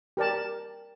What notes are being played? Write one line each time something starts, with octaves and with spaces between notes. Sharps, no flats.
G4 A#4 D5 A5